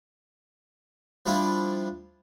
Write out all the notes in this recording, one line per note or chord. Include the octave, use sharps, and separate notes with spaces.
F3 G3 D4 E4 F4